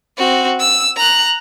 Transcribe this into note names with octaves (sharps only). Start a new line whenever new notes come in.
C4 F#4
E6
A#5 F#6